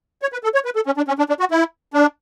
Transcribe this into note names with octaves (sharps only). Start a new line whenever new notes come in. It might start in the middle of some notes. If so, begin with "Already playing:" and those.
C#5
B4
A4
C#5
B4
A4
C#4
D4
C#4
D4
D4
F#4
E4
D4